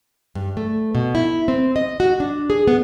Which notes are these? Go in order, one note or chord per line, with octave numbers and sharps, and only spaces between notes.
G2
A3
B2
E4
C4
D#5
F#4
D4
G#4
B3